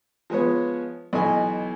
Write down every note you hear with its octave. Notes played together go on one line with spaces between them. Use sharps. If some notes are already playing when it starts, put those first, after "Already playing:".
F3 G#3 B3 C#5
B1 B2 E3 D#5 G#5